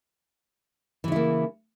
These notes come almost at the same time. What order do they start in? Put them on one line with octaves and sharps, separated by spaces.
E3 C#3 E4 A#3